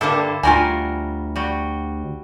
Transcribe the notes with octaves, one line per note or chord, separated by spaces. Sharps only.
G2 D3 A#3 E4 A4
D2 G3 F4 F#4 A#4 G#5
G3 F#4